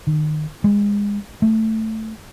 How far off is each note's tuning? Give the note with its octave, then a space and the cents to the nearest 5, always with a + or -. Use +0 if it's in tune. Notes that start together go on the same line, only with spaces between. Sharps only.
D#3 -30
G#3 -25
A3 +5